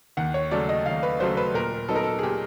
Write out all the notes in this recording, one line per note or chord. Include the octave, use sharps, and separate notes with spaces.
D#2 F#5
C#5
C#3 F#3 A3 D5
D#5
D#2 F5
B4
C#3 F#3 A3 C5
B4
A#2 A#4
F#3 B3 D#4 A4
A#4
A4
G#4
A#2 G4